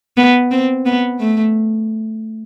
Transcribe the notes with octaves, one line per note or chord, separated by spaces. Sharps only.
B3
C4
B3
A3